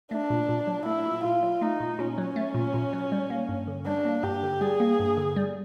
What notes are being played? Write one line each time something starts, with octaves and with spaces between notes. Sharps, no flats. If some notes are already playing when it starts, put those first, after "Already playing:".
A3 D4
A#2
A#2
F#3
A3 E4
A#2
A#2 F4
F#3
A3 D#4
A#2
A#2 C#4
F#3
A3
A#2
A#2
F#3
G3
A#3
G2
D3
G3 D4
A#3
G2 G4
D3
G3 G#4
A#3
G2
D3
G3